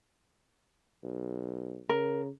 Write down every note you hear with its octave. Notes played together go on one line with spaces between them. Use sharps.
B1
C#3 A#4